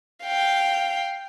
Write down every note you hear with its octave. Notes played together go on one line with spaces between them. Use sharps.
F5 G5